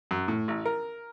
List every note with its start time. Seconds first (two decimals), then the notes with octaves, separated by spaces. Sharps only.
0.11 F#2
0.28 A2
0.48 A1
0.65 A#4